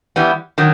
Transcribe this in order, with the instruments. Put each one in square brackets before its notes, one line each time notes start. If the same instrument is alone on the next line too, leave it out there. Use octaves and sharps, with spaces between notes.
[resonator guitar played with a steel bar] E3 G3 B3
D#3 F#3